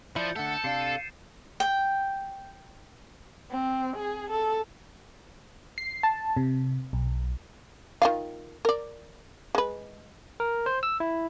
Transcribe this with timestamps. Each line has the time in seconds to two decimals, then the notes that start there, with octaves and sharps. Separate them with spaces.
0.16 F3 E4 D5 G6 C#7
0.36 D3 A3 A4 F#5
0.64 C3 D4 F5 C7
0.80 A6 D#7 E7
1.60 G5
3.51 C4
3.97 G#4
4.31 A4
5.78 C7
6.03 A5
6.37 C3
6.93 B1
8.02 D#3 F4 F5
8.65 A#4 D5
9.55 G#3 B4
10.40 A#4
10.66 C5
10.83 E6
11.00 E4